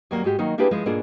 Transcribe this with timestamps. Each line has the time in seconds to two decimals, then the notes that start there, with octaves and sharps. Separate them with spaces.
0.11 D#2 F#3 G3 A#3
0.24 G#2 G#3 F#4 G4
0.39 D#3 F#3 A#3 D#4
0.58 A#3 D4 E4 G4 G#4 B4
0.71 F3 G#3 E4
0.86 G#2 B2 A#3 D4 F4 G#4